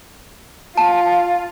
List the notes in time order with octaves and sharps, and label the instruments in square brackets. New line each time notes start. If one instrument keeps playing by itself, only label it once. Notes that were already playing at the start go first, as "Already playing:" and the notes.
[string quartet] F4 [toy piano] A5